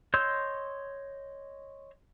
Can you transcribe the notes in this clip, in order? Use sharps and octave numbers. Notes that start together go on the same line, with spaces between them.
C#5 D#5 C6 E6 G6